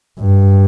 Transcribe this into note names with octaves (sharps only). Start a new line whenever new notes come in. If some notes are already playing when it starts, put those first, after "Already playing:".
G2